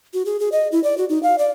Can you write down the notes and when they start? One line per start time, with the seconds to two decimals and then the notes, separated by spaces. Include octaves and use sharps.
0.14 F#4
0.26 G#4
0.40 G#4
0.52 D#5
0.72 E4
0.84 D5
0.98 F#4
1.09 D#4
1.23 F5
1.38 D5